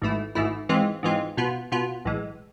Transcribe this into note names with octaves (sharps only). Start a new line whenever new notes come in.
G#1 G#2 E3 A3 E4
G#1 G#2 E3 A3 E4
G#2 E3 G#3 C4 F4
G#2 E3 G#3 C4 F4
B2 B3 F4
B2 B3 F4
B1 A2 E3 G#3